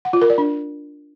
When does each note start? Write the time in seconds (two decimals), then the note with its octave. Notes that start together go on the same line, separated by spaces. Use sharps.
0.05 F#5
0.13 F4
0.21 A#4
0.30 D5
0.38 D4